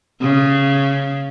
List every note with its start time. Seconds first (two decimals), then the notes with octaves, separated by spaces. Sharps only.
0.21 C#3